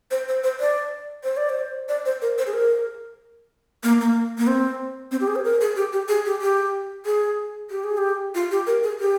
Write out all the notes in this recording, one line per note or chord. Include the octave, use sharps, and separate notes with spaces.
C5
C5
C5
D5
C5
D5
C5
D5
C5
A#4
C5
G#4
A#4
A#3
A#3
A#3
C4
C4
G4
G#4
C5
A#4
G#4
G4
G4
G#4
G4
G4
G#4
G4
G#4
G4
F4
G4
A#4
G#4
G4